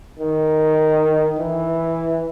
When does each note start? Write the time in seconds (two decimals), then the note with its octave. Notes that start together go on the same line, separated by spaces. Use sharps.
0.19 D#3
1.39 E3